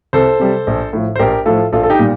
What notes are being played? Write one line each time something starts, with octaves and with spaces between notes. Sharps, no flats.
C2 A4 C5
C3 G3
A#1
A2 F3
C5
A#1 G4 A#4
A2 F3 F4 A4
A#1 F4 A4
A4
D#4 G4
A#2 G3